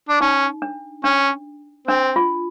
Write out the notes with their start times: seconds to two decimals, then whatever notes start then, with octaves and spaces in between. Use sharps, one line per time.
0.09 D4
0.21 C#4 D#4
0.62 D4
1.04 C#4 D4
1.88 C4 D4
2.16 F4